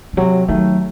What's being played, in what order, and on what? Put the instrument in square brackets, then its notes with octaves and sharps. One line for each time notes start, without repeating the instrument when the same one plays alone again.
[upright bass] D#3
[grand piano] C3 [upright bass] F#3
[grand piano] D#3 A3 [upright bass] F#3